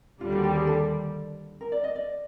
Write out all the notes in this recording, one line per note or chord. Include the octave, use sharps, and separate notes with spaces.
D#2 D3 G3 F4
F#4
G4
G#4
A4
A#4
D5
D#5
D5